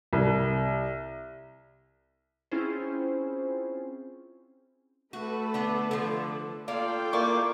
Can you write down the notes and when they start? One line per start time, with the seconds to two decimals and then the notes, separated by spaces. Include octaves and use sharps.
0.13 C2
2.52 C4 C#4 E4 F4 G#4 C5
5.13 A3 F#4 A4 B4
5.54 D3 B3
5.91 D3 F3
6.68 A#3 F4 A4 D5 F5 G5
7.13 A#3 E4 D5 C#6 D6